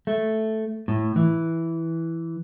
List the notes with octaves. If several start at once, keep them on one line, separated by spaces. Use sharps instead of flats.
A3
A2
E3